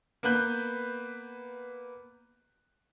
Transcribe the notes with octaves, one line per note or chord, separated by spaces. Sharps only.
A#3 B3 B4 F#6 G6